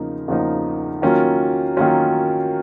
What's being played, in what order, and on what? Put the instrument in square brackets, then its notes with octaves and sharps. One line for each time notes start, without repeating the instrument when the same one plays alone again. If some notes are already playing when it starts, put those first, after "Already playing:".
Already playing: [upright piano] E2 C#3 F3 A#3 D#4
E2 C#3 F3 A#3 D#4
D#3 F#3 A#3 C#4 F4
D#3 F#3 A#3 C#4 F4